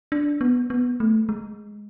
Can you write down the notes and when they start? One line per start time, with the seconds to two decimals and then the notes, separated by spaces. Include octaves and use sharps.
0.12 D4
0.41 B3
0.70 B3
1.00 A3
1.29 G#3